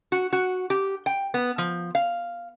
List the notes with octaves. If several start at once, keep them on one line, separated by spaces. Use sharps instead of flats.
F#4
F#4
G4
G5
B3
F3
F5